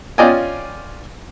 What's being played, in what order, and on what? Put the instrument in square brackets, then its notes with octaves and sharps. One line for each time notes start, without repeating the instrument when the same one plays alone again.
[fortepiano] C#4 F4 D5 D#5 G5 G#5